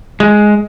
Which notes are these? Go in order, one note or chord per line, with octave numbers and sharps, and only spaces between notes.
G#3